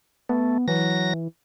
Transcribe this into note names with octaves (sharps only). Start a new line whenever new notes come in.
A3 B3
E3 F#3 A#6